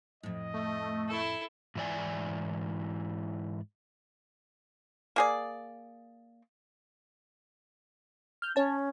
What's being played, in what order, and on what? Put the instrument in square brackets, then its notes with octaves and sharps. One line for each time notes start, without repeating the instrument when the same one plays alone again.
[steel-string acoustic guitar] F2 A2 [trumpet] D#5
[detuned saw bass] A3
[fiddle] E4 A4
[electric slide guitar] G#2 E3 E4 D5 G#5
[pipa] A#3 G#4 D5
[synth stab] F6 G6
[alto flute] C#4 [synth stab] C#5 A5